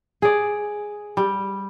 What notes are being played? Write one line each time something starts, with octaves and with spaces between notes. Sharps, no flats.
G#4 D5
G3